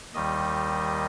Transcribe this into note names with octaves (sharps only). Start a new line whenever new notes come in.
D#2 D#3 G3 D#5